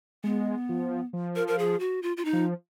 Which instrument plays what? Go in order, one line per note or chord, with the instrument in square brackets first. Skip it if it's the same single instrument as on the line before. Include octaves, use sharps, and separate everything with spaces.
[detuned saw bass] G#3 [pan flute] B3
[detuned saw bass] F3
F3
[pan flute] A#4
A#4
G#4
F#4
F4
F4
D#4
[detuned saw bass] F3